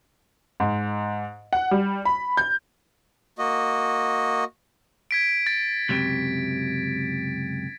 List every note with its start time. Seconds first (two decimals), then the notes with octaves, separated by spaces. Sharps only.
0.60 G#2
1.53 F#5
1.71 G3
2.05 B5
2.37 G6
3.38 A#3 F#4 D#5
5.11 G#6 B6 D7
5.47 A6
5.89 C#2 F#2 C3